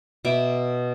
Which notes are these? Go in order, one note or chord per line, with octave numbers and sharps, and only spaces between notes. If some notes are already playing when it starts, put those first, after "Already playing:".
B2 E5 D6